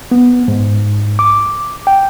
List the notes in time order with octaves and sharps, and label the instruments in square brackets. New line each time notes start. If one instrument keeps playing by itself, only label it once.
[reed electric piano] B3
G#2
D6
G5